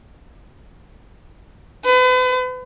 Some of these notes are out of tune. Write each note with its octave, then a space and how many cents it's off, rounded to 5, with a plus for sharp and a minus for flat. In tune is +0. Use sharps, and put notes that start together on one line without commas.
B4 +40